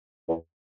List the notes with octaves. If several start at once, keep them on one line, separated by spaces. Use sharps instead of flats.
E2